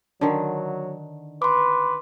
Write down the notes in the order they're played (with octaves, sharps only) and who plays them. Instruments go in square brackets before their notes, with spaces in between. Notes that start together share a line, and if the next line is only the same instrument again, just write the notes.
[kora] D3 D#3 [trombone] F#3
[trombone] B4 [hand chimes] C6 D6